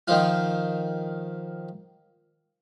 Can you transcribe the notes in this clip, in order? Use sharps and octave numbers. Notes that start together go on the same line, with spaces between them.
D#3 F3 F4